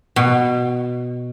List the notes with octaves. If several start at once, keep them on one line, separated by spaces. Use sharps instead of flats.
B2